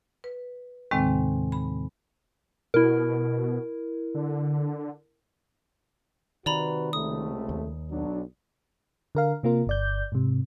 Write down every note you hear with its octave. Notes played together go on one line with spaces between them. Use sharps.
B4
D#2 A2 C3 D#3 G#3 C4
B5
B2 E4 A#4
D3
C3 D#3 F#4 B4 D5 A#5 B5
C#2 C3 A3 D#6
D#2
B1 F#3 D4
D3 A#4 F5
C3 A#3 F4 A#4
G1 D5 G6
G#2 C3